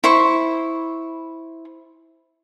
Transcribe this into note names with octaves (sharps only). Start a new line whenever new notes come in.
E4 C5 C#6